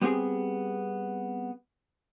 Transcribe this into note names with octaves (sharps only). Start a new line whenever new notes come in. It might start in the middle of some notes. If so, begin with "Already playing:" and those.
G3 B3 C4 G4 G#4